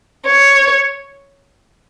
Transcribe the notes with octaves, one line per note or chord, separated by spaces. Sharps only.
C#5